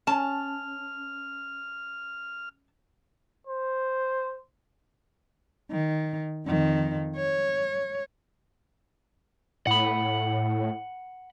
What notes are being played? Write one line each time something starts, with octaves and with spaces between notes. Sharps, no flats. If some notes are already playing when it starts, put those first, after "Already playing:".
C#4 A5 F6
C5
D#3
F2 D#3
C#5
A2 F#5 B5